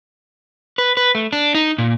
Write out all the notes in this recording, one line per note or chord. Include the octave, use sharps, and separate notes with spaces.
B4
B4
A3
D4
D#4
A#2